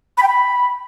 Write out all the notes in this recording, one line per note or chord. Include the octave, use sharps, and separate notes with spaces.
B5
G5
B5